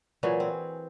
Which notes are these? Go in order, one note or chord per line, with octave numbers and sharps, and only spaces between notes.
A#2 E3 F#3 G#4
C4